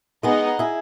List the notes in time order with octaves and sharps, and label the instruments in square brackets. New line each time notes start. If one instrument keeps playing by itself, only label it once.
[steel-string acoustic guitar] G#3 B3 [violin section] D#4 G#4 D#5 F#5
[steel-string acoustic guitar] E4 G#4